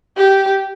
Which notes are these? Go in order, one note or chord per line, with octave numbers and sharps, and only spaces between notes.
G4